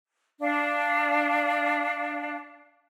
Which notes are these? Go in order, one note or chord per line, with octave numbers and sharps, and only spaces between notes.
D4 F5